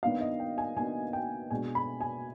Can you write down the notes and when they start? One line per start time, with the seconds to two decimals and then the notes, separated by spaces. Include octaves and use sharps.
0.03 D#3 B3 D4 F5
0.21 D#5
0.40 G5
0.58 G#5
0.76 D#3 B3 D4 G#5
1.13 G5
1.51 B2 G#3 D4 G#5
1.75 B5
2.01 G#5